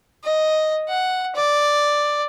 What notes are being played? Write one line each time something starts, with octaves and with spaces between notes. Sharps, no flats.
D#5
F#5
D5